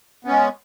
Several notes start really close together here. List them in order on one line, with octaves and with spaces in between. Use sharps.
B3 C#4 G#3